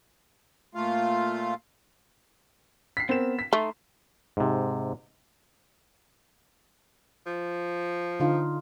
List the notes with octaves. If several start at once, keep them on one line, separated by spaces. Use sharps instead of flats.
A#2 A3 F4 F5
B6 C7
B3 C4 A#4 E7
B6
A3 D#4 C6
G#2 C3
F3
D3 D#4 F4